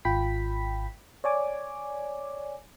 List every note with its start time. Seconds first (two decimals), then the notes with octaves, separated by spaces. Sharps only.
0.05 G#1 F4 G5 B5 B6
1.24 C#5 D5 G#5 D6